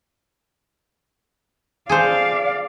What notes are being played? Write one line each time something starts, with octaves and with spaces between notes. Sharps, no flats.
G#4 A4 C5 D5 F5